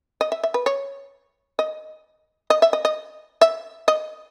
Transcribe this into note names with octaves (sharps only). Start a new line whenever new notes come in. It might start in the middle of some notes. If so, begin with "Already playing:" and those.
D#5
E5
E5
B4
C#5
D#5
D#5
E5
D#5
D#5
E5
D#5